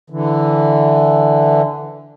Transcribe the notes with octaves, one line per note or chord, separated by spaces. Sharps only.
D3 E3